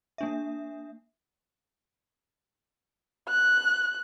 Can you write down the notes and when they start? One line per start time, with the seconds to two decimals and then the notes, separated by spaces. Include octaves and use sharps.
0.18 A#3 D4 E5
3.29 F#6